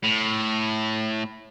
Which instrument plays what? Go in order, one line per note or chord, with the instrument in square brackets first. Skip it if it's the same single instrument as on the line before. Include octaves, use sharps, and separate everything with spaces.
[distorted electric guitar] A2